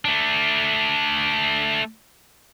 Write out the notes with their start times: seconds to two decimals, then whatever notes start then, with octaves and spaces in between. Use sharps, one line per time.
0.05 A3 D4